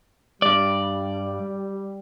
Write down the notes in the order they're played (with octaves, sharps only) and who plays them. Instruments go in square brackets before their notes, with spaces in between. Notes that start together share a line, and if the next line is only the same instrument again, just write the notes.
[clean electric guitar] G2 D5 [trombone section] G3